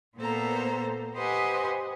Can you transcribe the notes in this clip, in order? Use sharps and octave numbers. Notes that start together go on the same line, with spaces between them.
A#2 A#3 B3 A4 C5 A#5
G4 B4 C5 D#5 F#5 G#5